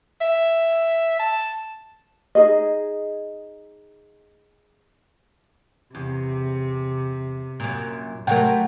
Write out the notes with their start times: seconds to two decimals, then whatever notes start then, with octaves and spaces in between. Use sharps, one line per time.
0.21 E5
1.19 A5
2.35 D#4 G#4 D#5
5.95 E2 C3
7.60 F#2 A#2
8.27 C3 F#3 A3 A#4 F#5 G5